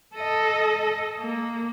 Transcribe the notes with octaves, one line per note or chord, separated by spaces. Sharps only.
A4 D#5
A#3